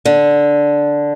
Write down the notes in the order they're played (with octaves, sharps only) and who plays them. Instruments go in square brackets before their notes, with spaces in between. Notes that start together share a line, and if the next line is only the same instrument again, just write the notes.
[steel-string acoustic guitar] D3